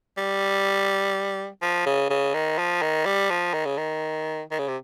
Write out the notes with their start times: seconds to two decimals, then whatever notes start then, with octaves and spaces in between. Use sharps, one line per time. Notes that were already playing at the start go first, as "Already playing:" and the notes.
0.18 G3
1.62 F3
1.86 C#3
2.10 C#3
2.34 D#3
2.58 F3
2.82 D#3
3.06 G3
3.30 F3
3.54 D#3
3.65 C#3
3.78 D#3
4.51 D#3
4.59 C#3
4.68 C3